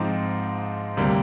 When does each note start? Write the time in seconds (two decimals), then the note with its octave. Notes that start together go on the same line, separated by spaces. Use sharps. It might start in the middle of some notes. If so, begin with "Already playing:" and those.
Already playing: G#2 F3 C4 D#4 D6
0.97 D2 C3 G3 A#3